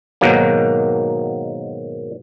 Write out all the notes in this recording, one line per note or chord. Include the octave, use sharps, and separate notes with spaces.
G#2 B2 D#3 F#3 A#3